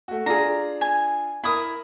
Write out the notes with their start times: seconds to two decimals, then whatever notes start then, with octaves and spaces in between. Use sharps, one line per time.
0.08 A3 F#4
0.26 D4 F4 G#4 A#5
0.81 G#5
1.44 E4 A#4 B5 D#6